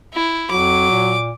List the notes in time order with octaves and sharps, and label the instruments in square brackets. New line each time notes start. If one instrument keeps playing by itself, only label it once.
[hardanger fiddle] E4
[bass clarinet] F2 [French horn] F#3 [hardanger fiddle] D6
[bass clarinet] A#2